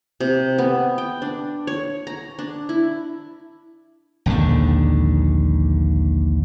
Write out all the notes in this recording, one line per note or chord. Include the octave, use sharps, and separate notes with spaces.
C3
B3
G5
D4
C#5
A#5
D4
E4
A#1 D#2 G#2 D3